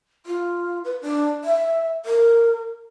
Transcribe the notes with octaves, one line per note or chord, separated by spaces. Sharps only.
F4
B4
D4
E5
A#4